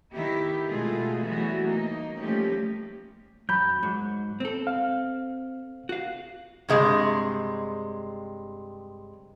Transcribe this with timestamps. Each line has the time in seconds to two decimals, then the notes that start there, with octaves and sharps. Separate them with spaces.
0.13 D#3 B3 E4 G4
0.67 B2 G#3 A3 F4 G#4 A4
1.24 E3 F#3 G3 A3 B3 F#4
1.64 A#3 D#4
2.20 F3 G3 A3 A#3 C#4 G4
3.49 F#2 B5 G6
3.83 G#2 F#3
4.40 C4 A4
4.67 F5
5.89 F#4 F5
6.69 G2 C3 G#3